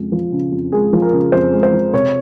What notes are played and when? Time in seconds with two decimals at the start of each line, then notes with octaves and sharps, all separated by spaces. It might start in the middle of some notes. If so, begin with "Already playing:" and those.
Already playing: F2 C#3 G#3
0.12 F3
0.32 C#3
0.52 F2
0.72 G#3 G#4
0.93 F3
1.02 A#4
1.13 C#3
1.32 F2 C5
1.53 G#3
1.63 C5
1.73 F3
1.93 C3 C#5